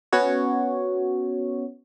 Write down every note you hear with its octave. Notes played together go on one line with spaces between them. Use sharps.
B3 C#4 F#4 C#5